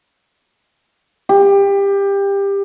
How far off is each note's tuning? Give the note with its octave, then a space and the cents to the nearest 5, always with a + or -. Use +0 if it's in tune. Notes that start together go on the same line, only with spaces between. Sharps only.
G4 +20